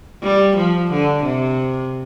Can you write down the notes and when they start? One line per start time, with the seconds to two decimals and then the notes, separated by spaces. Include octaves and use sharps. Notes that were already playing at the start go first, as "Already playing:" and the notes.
0.23 G3
0.56 F3
0.91 D3
1.24 C3